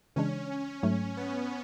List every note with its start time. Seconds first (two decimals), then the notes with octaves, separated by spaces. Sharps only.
0.16 C#3 E3 G#3 C#4 D4
0.83 G#2 F#3 A3
1.17 B3